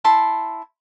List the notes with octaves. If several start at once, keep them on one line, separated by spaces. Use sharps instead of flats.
E4 A5 C6